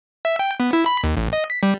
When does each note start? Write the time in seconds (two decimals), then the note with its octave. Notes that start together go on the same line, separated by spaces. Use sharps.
0.25 E5
0.39 G5
0.60 B3
0.73 E4
0.86 B5
1.04 D#2
1.17 A1
1.33 D#5
1.50 B6
1.63 G3